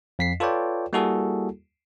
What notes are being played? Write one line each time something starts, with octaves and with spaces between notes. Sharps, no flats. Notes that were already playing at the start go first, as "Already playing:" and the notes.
F2 B6 C7
F4 A4 B4 C#5 D5 G5
G3 A#3 E4 F#4 G#4 A4